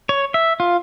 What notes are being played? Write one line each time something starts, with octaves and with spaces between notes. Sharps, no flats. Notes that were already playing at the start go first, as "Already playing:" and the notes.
C#5
E5
F4